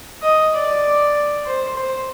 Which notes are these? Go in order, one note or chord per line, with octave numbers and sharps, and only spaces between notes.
D#5
D5
C5
C5